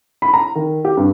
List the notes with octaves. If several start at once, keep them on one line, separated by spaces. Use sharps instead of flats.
B5
A#5
D#3
G4
G2